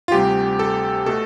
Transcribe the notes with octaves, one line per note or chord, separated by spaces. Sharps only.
F4
D2 C3 G3 G4
A4
B2 A3 A4